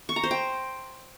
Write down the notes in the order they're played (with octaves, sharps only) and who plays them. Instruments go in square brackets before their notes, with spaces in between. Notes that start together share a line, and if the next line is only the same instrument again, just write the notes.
[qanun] C#6
A#5
C5
G5